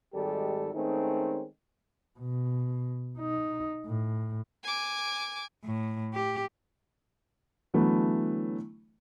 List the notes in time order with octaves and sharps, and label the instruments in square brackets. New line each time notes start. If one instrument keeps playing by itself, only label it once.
[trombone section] G#1 D#3 G3 G#3 G4 A4
D#3 G#3 A3 C4 C#4 D#4
[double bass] B2
D#4
A2
[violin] G#5 D6
[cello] A2
G4
[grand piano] D3 E3 F#3 A3 B3